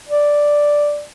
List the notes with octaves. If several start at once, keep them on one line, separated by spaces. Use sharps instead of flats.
D5